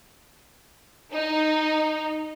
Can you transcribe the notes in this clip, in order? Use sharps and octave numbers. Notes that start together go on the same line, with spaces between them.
D#4